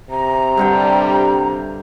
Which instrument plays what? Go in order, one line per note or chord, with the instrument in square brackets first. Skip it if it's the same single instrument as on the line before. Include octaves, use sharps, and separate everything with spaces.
[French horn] C3 [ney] A#5
[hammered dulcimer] G2 D3 G5 [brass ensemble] G3